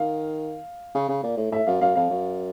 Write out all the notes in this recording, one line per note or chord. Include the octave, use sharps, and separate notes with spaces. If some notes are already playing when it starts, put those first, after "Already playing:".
Already playing: D#3 F5
C#3
C#3
A#2
A2
A2 E5
F#2 F5
F#2 F5
F2 F5
F#2